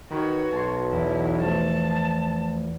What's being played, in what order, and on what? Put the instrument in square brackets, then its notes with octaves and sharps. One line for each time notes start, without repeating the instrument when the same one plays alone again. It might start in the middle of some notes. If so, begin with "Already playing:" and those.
[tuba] D#3 [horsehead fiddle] F#4 C#5 [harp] A#4 B4
[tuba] B1 [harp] A5 C6
[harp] E2 E7 [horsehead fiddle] E4
[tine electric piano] F3 A3 [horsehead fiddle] A5